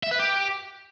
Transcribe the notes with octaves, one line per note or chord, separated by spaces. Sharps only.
E5
B4
G4